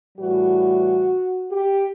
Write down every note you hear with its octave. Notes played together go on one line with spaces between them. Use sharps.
A2 E3 G3 F#4
G4